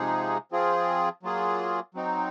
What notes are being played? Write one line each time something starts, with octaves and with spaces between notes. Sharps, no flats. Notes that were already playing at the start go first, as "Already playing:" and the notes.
Already playing: C3 F3 G#3 D#4 G#4
F3 C4 F4 G#4
F#3 A#3 F4 G#4
F#3 C4 D#4